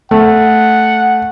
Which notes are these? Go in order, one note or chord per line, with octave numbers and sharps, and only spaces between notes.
A3 F#5